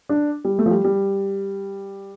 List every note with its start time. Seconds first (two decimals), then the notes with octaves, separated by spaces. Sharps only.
0.09 D4
0.45 G3
0.59 A3
0.66 F3
0.71 G3
0.85 G3